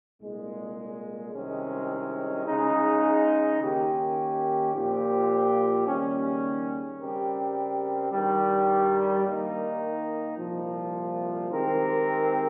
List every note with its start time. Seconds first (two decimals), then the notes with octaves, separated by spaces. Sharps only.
0.21 C2 A#2 G#3
1.34 C2 C3 D#3 G#3 C#4
2.47 C#3 G#3 D#4
3.60 D#3 A#3 C#4 G4
4.74 A#2 F3 C4 G4
5.86 D#2 C#3 G3 C#4
6.99 C#3 G3 C4 G4 A#4
8.12 G2 D#3 G3
9.24 D#3 A#3 D#4
10.37 C2 A#2 F3
11.50 D#3 G#3 C4 G4 A#4